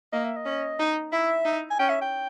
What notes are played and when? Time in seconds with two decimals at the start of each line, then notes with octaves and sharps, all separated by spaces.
0.13 A#3 D#5
0.24 E5
0.36 D#5
0.45 C#4
0.79 D#4
1.12 E4 E5
1.45 D#4
1.70 G#5
1.79 C#4 G5
1.89 E5
2.02 G5